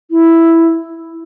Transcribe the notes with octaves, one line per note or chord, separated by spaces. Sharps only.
E4